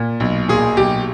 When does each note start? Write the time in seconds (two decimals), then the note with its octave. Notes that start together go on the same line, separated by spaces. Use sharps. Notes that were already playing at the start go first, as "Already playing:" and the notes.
Already playing: A#2
0.20 B1
0.49 A#2 G#4
0.77 B1 G4